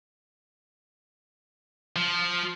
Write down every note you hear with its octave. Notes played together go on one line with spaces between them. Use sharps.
F3